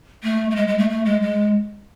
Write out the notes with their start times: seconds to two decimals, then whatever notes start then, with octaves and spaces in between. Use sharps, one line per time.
0.23 A3
0.50 A3
0.55 G#3
0.67 G#3
0.78 A3
0.89 A3
1.05 G#3
1.22 G#3